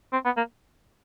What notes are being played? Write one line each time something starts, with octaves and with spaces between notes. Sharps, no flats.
C4
B3
A#3